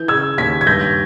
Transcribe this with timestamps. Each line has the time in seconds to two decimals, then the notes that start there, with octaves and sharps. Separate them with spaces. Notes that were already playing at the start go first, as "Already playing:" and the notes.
Already playing: E3 G6
0.08 C#3 E6 G#6
0.38 D#2 G#6 B6
0.61 G#6
0.67 G2 G6 A#6